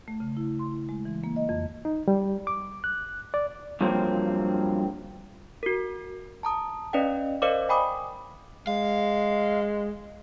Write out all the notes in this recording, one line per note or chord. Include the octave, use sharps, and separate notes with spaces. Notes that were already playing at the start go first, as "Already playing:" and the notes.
A3
C#3
E4
C6
E4
G#3
E3
A#3
D#5
F2
D#4
G3
D6
F#6
D5
G2 F3 F#3 A#3 C4
F#4 A#4
A5 A#5 D#6
C#4 B4 D5 D#5 F5 G5
A#4 C5 D5 D#5 F5 D6
G5 G#5 B5 D6 D#6
G#3 F5